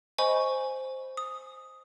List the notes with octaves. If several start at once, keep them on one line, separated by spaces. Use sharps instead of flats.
C5 D#5 G#5 B5 C#6
D#6